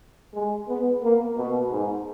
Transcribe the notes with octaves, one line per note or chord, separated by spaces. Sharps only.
G#3
B3
A#3
B2
G#2